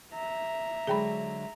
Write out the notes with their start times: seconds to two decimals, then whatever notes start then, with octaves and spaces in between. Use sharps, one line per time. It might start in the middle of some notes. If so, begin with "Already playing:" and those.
0.14 E5 A#5
0.87 D3 F#3 G#3 G#4 G5 B5